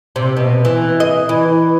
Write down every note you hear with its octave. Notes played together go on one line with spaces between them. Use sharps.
C3
B2
E3
D#5
E3